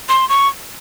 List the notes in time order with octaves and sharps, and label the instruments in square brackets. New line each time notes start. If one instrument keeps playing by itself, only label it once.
[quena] C6
C#6